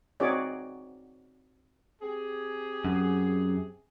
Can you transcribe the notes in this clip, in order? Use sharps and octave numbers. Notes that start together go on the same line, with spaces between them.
C4 D#4 F#4 G#4 C#5 D5
C4 G4 G#4
F#2